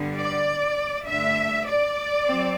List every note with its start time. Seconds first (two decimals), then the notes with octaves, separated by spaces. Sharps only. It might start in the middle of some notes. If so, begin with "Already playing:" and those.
Already playing: G2 D3 G3 B3
0.17 D5
1.07 G2 D3 A3 D4 E5
1.67 D5
2.26 F#3 C4